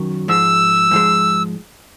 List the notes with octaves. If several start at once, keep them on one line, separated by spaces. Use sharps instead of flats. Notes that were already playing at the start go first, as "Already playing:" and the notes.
Already playing: F#2 D#3 F#3
G#2 F3 G#3 E6
G#2 F3 G#3